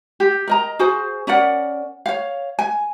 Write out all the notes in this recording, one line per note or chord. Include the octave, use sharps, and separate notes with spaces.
G4
A#4 D#5 A#5
F#4 G#4 C5 G#5
C#4 A#4 D5 F#5
C#5 F5
G#5